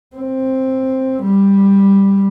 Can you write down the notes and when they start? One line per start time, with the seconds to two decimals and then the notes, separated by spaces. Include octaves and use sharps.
0.16 C4
1.22 G3